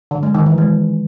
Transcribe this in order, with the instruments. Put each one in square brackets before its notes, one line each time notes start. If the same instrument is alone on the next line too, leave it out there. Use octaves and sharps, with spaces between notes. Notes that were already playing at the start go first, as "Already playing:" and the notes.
[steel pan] D3
G#3
D#3
E3
G#3